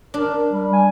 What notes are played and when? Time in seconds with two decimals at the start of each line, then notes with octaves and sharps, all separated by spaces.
0.14 D4 A#4
0.51 G3
0.73 G#5